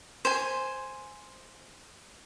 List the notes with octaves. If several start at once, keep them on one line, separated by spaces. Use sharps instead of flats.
C5 G#5